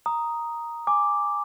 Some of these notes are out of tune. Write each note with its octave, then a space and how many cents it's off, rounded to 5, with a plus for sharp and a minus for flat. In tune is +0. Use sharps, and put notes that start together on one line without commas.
A#5 +0 D#6 +0
G#5 -15 D6 +0